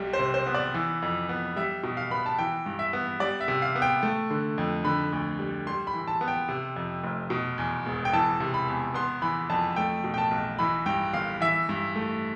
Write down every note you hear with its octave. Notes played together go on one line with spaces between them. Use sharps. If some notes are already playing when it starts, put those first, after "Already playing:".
Already playing: B1 G3
C5
C3
C5
B3
D5
E3
F2
B3
G3 E5
B2
F5
B3 B5
A5
E3 G5
G2
E5
B3
G3 D5
E5
C3
F5
B3
G5
A3
D3
F2
D3 B5
D2
G3
G3 C6
B5
E3
A5
B3
G5
C3
F2
F1
B2
E2
E1
G5
E3 A5
C3
B5
E2
B3 C6
E3 B5
F2 A5
A3 G5
B2
G5
A5
B1
E3 B5
G2 G5
G1 F5
E3 E5
G2
A3